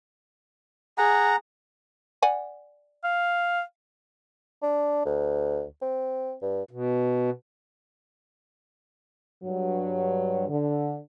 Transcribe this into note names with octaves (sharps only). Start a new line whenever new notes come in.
G#4 F#5 A#5
D5 F#5 G#5
F5
D4
D2
C4
G2
B2
G2 F#3
D3